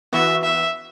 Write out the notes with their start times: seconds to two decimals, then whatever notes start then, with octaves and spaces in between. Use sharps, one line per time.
0.13 E3 B3 F#4 E5
0.43 E5